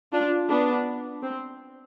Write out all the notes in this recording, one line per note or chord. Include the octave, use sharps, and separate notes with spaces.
D4 F4
B3 D4
C4